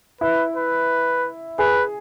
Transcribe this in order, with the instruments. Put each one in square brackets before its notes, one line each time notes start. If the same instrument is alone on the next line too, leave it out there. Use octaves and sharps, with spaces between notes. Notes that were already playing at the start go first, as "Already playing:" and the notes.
[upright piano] E4 [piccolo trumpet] B4
[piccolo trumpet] B4
[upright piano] G#4 [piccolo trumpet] B4